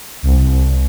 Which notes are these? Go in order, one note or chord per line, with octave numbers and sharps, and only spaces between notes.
C2
C2